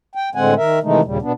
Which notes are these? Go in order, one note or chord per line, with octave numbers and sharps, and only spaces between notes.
G5
A2 D3 G#3 C4 F#5 G#5
D#3 A#4 E5
C3 D#3 E3 G#3 A3 D#4
D#2 A#2 C#3 G3
B2 B3 D4